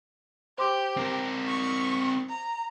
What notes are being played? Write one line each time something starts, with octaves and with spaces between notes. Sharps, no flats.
G4 C5 C6 D6
C4 A#4
C#6
A#5